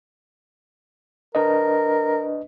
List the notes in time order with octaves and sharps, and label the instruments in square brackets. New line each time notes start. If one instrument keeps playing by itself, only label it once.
[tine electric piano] D4 B4 D#5 [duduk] A#4